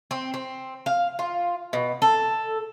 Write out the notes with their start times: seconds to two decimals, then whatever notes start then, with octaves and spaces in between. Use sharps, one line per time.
0.11 C4
0.34 C4
0.86 F5
1.19 F4
1.73 B2
2.02 A4